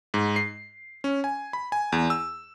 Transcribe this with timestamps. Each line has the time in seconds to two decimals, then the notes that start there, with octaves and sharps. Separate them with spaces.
0.14 G#2
0.36 C7
1.04 C#4
1.24 G#5
1.53 B5
1.72 G#5
1.92 E2
2.10 E6